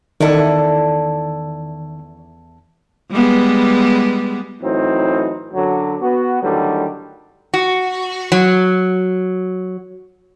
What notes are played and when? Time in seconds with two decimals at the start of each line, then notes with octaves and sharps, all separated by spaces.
0.20 E2 D#3 C#4 E4 A4 D5 D#5
3.11 G3 G#3 B3
4.62 A2 E3 F#3 C4 D#4
5.54 F#2 D3 F#3
6.00 B3 F#4
6.42 A2 D3 D#3 F#3 G3
7.54 F#4
8.32 F#3